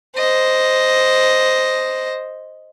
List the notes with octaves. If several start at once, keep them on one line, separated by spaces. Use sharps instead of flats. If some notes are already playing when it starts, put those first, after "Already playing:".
C5 D#5